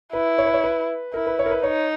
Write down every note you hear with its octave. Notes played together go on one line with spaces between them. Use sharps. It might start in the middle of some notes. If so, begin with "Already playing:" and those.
E4 B4
C#5
B4
C#5
B4
E4 A#4
B4
C#5
A#4
B4
D#4 C#5